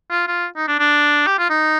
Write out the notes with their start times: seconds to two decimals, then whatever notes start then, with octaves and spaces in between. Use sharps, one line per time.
0.10 F4
0.28 F4
0.57 D#4
0.68 D4
0.79 D4
1.27 G4
1.39 F4
1.50 D#4